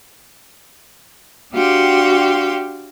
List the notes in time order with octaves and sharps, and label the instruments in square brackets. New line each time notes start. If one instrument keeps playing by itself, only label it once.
[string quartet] D4 F#4 G4 F5 G5 C6